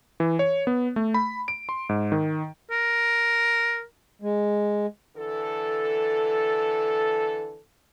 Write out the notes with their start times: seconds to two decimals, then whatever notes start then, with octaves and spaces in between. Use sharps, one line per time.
0.20 E3
0.39 C#5
0.67 B3
0.96 A3
1.14 B5
1.48 D7
1.69 C6
1.89 G#2
2.12 D#3
2.71 A#4
4.22 G#3
5.17 D3 E3 A4